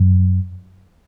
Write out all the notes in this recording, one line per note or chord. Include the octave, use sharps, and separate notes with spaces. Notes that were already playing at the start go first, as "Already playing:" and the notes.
Already playing: F#2